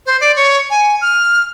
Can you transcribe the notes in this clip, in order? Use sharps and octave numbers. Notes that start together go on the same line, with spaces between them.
C5
D5
C#5
G#5
F6